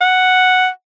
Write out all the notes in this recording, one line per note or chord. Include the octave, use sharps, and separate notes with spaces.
F#5